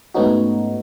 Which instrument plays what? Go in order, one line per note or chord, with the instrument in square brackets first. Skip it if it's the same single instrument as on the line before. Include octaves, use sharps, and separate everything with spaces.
[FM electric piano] G#2 A3 B3 C#4 D#4 F#4